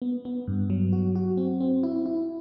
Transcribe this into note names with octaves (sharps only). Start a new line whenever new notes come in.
B3
B3
G2
F#3
F#4
F#4
C4
C4
E4
E4